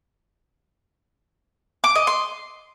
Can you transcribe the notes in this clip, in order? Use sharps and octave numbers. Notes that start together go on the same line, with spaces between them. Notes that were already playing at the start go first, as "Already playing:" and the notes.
D6
D#5
C6